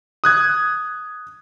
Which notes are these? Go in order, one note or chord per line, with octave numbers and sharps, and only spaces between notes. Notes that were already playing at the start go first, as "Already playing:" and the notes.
D#6 F#6 G#6